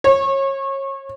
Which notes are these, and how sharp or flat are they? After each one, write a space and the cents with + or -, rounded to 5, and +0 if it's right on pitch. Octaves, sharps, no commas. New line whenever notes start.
C#5 -25